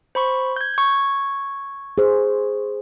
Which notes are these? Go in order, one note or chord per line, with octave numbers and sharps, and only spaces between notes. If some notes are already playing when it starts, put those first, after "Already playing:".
C5 B5 C#6
G6 G#6
C#6 G#6
G#4 C5